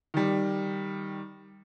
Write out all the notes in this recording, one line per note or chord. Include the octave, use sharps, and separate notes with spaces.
D#3 G3